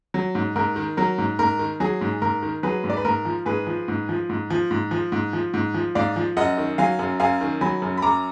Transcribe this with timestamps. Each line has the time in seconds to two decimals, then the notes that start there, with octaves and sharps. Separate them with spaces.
0.14 F#3
0.35 G#2
0.56 G#2 A#4
0.76 D#3
0.97 F#3 A#4
1.18 G#2
1.39 G#2 A#4
1.59 D#3
1.80 F#3 G#4
2.01 G#2
2.22 G#2 A#4
2.43 D#3
2.63 F#3 G#4 B4
2.84 G#2
2.90 D5
2.97 B4
3.05 G#2 A#4
3.25 F3
3.46 G#2 G#4 B4
3.67 F3
3.88 G#2
4.09 F3
4.29 G#2
4.50 F3
4.71 G#2
4.91 F3
5.12 G#2
5.33 F3
5.54 G#2
5.74 F3
5.95 G#2 D5 F5
6.16 F3
6.37 F#2 D#5 F#5
6.58 D#3
6.78 F#3 F5 G#5
6.99 F#2
7.20 F#2 F5 G#5
7.41 D#3
7.61 F#3 G#5 B5
7.82 F#2
7.98 B5
8.02 F#2 A#5 D6